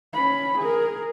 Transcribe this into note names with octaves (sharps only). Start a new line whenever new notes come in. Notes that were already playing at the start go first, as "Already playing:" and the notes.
C#4 B5
G#4 A#4